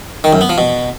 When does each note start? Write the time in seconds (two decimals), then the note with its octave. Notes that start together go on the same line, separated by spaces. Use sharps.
0.24 D#3
0.33 F#2
0.41 B3
0.49 F3
0.58 B2